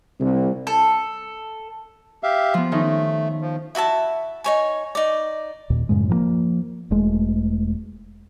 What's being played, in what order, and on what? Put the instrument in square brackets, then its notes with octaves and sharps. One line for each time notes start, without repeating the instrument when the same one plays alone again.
[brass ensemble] C2
[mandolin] A4
[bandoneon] G4 E5 F5
[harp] F3 B3
[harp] D#3 C#4 D#4 [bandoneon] A3
[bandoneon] F3
[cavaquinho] E4 F#4 E5 A5
D#4 C#5 G#5
D#4 D5
[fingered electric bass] D#2 A#2
F#2 A2 C#3 G#3
F3 F#3 A#3
E1 G#3 A3